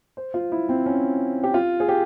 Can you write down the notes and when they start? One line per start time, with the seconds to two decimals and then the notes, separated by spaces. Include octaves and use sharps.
0.17 C5
0.34 F4
0.52 E4
0.69 C4
0.86 C#4
1.43 G4
1.54 F4
1.80 G#4
1.88 G4